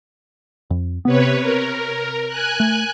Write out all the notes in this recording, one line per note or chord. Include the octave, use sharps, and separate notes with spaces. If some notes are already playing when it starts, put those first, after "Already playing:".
F2
C3 B3 B4 C#5
A#4
G#5 F#6
A3